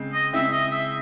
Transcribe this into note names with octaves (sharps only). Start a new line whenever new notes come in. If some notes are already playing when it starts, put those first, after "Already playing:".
Already playing: C#3 G#3 C4
D#5
C#3 G#3 C4 E4 E5
D#5
E5